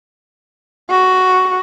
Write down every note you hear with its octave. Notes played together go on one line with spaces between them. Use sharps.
F#4